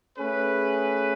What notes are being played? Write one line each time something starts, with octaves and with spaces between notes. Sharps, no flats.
A3 C#4 G#4 B4